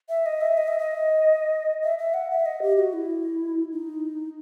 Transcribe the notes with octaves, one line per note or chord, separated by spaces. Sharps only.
E5
D#5
E5
D#5
E5
D#5
E5
E5
F#5
E5
D#5
G4
F#4
E4
D#4